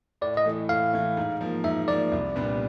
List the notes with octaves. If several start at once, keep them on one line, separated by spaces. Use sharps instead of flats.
A2 D5
D#5
E3 A3
A2 F5
E3 A3
G#2
F3 A#3
G#2 E5
F3 A#3 D5
C2
A#2 G3 B3 D4